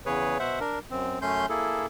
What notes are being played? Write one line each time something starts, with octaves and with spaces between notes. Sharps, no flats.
E2 C#3 G#4 B4 C#5
B2 C5 E5 F#5
D4 A#4
F#2 C4
F#2 A3 C#4 C6 G6
A#3 E4 G#4 A4